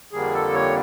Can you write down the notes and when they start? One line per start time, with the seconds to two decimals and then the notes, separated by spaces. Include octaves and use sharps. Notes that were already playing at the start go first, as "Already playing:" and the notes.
0.13 F2 D3 G3 A#3 G#4
0.34 A4
0.54 C#5